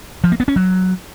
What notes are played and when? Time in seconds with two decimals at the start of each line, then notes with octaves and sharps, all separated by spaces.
0.24 F3
0.32 A#3
0.40 B3
0.48 C#4
0.56 F#3